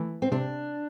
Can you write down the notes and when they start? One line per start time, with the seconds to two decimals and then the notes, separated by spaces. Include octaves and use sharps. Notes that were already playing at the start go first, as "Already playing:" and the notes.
Already playing: E3 A3
0.22 C4
0.32 C3 D4